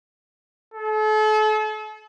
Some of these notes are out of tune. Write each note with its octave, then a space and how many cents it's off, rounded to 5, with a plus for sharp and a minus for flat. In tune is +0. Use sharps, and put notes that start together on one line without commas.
A4 -40